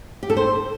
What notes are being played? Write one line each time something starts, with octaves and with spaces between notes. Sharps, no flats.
G4
A4
C5